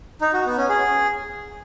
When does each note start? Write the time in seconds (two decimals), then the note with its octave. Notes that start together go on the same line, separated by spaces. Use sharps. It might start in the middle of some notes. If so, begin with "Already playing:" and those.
0.21 D#4
0.33 F#4
0.45 B3
0.57 C#4
0.69 G#4